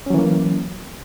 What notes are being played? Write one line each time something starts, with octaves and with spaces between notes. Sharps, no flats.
E3 F#3 A#3 C#4